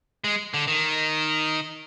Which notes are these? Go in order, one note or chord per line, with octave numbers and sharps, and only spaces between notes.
G#3
D3
D#3